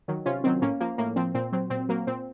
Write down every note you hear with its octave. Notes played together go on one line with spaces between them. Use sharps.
D#3 F#3
C3 C#4 F4
D#3 F#3 C4
A2 A#3 C#4
F3 A#3
A2 A#3
F3 C4
A#2 C4
F#3 C4
A#2 C4
F#3 A#3
A#2 C4